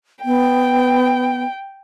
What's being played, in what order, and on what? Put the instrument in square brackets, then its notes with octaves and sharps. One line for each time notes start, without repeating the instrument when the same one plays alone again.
[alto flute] B3 [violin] G5